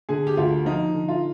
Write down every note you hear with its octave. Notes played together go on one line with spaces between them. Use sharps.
D3 G#4
G4
D2 F4
F3 D#4
D3
F4